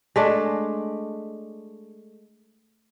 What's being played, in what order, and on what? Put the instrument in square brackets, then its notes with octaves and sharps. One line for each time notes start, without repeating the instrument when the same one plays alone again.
[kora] G#3 A3 D4